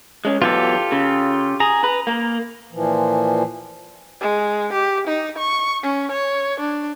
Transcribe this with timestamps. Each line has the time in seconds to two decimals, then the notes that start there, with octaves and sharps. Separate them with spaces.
0.25 G#3 C#4
0.42 E3 F#3 B3 F4 G4 A4
0.92 C#3
1.60 G#4 A#5
1.84 B4
2.07 A#3
2.73 A#2 E3 F3
4.21 G#3
4.73 G4
5.07 D#4
5.38 C#6
5.83 C#4
6.11 C#5
6.60 D4